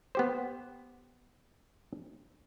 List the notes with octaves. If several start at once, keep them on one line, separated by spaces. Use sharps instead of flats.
B3 G4 C5